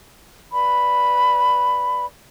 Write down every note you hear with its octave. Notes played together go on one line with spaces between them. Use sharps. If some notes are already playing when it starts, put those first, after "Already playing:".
B4 D5 B5